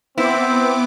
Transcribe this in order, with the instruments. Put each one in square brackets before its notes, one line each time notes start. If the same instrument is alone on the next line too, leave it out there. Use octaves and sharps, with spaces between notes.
[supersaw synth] B3 D6 [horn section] C4 [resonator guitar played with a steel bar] E4